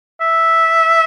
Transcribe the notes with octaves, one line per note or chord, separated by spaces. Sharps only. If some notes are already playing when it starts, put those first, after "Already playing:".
E5